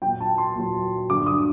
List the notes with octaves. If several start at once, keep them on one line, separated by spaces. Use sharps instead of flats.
A#2 F#3 G5
A5
C6
A#2 F#3
G2 D3 F#3 D6
D#6